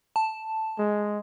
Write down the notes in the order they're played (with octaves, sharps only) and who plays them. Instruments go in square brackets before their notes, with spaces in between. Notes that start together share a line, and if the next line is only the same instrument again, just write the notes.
[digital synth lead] A5
[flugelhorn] G#3